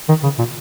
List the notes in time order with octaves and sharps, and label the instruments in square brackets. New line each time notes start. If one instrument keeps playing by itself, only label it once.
[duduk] D#3
C#3
A#2